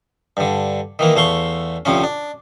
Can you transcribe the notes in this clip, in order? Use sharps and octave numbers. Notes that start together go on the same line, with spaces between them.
G2 D3
D#3 E3 A#3
E2 A3 F5 C6 C#6
D2 C3 F3 C#4
D4